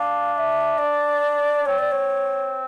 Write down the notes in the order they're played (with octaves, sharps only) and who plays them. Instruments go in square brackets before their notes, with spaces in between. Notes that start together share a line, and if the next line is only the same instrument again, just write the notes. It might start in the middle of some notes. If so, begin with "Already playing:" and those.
Already playing: [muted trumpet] D4 [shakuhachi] F5
[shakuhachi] F5
E5
D5
[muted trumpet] C4 [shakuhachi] C#5
[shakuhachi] D5
C#5